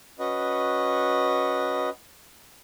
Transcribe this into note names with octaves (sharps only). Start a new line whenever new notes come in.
C#4 F#4 B4 D#5